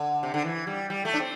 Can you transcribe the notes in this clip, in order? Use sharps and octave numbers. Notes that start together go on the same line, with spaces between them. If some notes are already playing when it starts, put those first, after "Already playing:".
Already playing: D3
C3
D3
E3
G3
G3
A3
D4
C4